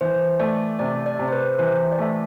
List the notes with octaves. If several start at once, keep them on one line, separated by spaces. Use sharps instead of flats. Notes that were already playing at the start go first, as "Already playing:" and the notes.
E3 C5
A3 D5
C3 D5
D5
C3
C5
B4
E3 C5
D5
A3 E5